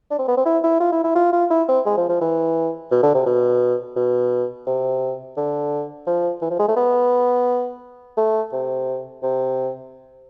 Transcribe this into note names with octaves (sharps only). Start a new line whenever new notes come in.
D4
C4
B3
C4
E4
E4
F4
E4
E4
F4
F4
E4
C4
G#3
F3
F3
E3
B2
D3
C3
B2
B2
C3
D3
F3
E3
F3
G#3
A3
B3
A3
C3
C3